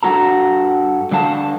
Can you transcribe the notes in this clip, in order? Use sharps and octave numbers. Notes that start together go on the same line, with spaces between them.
G2 F#4 A4 A#5
D3 G3 F5 A5